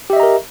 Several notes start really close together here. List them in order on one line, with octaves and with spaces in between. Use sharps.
G4 E5 D#5 A#5 A#4